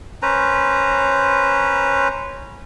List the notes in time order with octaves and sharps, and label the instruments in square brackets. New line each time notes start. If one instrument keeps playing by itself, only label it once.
[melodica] C#4 B4 C5 A#5